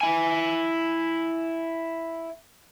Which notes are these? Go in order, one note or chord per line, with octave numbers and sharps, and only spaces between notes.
E4 G#5